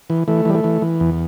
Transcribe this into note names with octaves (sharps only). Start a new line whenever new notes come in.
E3
E3 A3
E3 G3
A3
E3
E3
E2